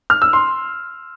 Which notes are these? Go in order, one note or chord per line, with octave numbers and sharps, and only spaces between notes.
F6
E6
C6